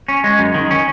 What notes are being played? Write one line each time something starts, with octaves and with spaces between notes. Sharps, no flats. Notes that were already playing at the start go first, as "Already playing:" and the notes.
C#4
G#3
F#2
D#3
C#4